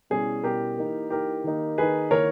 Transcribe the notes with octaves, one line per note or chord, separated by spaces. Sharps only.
B2 G3 C#4 E4 G#4
B2 G3 C#4 E4 G4 A#4
E3 A#3 D#4
E3 A#3 D#4 G4 A#4
D#3 A#3 D#4
D#3 A#3 D#4 G#4 B4
D#3 A#3 E4 A#4 C#5